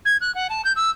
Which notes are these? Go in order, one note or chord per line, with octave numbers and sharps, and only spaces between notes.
G#6
F#6
F#5
A5
G6
E6